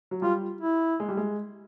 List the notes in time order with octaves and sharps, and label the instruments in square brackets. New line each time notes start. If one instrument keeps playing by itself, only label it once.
[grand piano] F#3
[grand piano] G3 [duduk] F4
[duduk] E4
[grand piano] G#3
G3
G#3